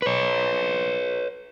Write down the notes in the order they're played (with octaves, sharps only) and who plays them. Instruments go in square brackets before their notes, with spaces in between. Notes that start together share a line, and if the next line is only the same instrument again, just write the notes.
[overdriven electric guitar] B4 C#5